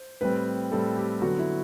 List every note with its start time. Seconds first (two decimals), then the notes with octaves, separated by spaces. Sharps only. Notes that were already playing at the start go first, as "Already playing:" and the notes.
Already playing: C5
0.21 A2 G3 C4 B4
0.71 A2 G3 C4 A4
0.96 G4
1.21 D3 F#3 B3 F#4
1.39 E4